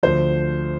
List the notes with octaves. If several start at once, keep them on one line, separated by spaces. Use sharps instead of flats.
D2 D3 F3 C5